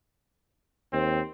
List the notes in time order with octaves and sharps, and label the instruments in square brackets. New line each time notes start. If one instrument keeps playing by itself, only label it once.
[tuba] D#2 [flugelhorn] C4